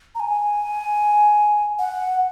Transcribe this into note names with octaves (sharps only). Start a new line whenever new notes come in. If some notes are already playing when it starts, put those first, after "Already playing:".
A#5
G#5
F#5